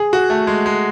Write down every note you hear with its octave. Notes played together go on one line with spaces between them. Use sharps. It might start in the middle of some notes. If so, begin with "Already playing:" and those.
Already playing: G#4
F#4
A3
G#3
G#3